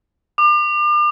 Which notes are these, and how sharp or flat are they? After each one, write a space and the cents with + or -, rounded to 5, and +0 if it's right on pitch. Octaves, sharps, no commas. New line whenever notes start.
D6 +40